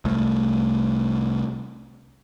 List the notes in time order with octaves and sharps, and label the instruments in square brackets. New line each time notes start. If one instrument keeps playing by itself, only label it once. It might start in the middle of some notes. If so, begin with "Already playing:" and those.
[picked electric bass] C2 A3